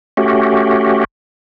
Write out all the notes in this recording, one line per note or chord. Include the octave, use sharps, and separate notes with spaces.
A3 C#4 F#4 G4